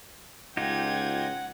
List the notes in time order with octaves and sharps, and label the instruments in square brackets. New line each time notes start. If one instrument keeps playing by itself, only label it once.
[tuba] C#2 [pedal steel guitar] D#4 F4 G4 [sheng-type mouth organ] F#5 [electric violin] G5 G#6